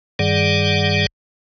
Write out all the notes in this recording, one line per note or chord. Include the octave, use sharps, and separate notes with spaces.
G2 D#3 G3 G#4 D5 F#5